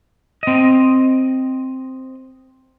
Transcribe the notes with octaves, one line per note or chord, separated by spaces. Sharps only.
C4 D#5